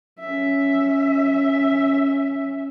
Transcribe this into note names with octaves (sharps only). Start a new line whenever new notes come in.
C#4 E5